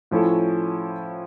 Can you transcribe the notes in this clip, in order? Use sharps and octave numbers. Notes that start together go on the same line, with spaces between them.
A2 F3 C#4 E4 A4